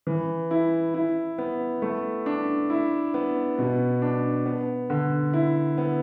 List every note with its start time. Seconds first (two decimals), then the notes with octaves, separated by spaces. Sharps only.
0.07 E3
0.51 E4
0.94 E4
1.38 B3
1.82 A3
2.26 D4
2.70 E4
3.14 B3
3.58 B2
4.02 D4
4.46 B3
4.90 D3
5.33 E4
5.78 B3